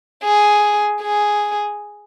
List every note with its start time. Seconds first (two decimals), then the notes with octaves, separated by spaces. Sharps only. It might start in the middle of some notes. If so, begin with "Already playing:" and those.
0.24 G#4
1.02 G#4